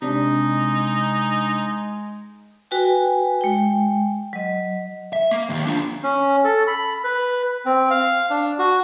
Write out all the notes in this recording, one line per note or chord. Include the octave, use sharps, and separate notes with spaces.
C3 G#3 D4 D#4
F#4 B4 G5 G#5
G#3 G5
F#3 D#5
E5
A#3
D#2
D4 F4
C#4
A4
B5
B4
C4
F5
D4
F#4